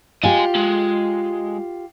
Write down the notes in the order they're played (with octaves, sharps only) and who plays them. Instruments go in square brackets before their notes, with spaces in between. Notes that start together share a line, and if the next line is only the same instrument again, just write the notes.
[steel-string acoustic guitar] F4 G4 [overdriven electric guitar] D#5 G#5
[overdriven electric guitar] G#3